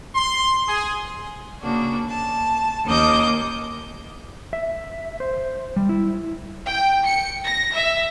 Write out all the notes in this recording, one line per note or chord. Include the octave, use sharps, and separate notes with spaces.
C6
G#4
C#3 A#3 D4 F#4
A5
D#2 A#3 C#4 D#5 D6 G6
E5
C5
G3
E4
G5
C#7
A#6
E5